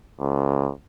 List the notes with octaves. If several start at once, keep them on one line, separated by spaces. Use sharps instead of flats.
C#2